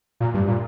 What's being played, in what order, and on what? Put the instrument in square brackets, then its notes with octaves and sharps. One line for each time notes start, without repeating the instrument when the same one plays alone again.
[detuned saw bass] A#2
G2
A#2